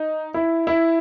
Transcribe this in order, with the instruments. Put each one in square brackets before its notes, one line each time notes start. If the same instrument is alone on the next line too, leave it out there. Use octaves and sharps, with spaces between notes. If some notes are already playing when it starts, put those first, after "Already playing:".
Already playing: [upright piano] D#4
E4
E4